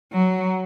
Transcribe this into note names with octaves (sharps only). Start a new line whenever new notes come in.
F#3